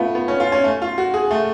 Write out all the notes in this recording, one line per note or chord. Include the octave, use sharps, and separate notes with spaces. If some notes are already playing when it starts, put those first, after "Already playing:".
Already playing: A3 B3 F4 B4 F5
B3
C#4
F4
C#4
A3
F4
F#4
G#4
A3